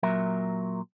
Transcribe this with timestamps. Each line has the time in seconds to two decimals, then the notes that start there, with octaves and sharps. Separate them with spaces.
0.03 A#2 F#3 A#4 E5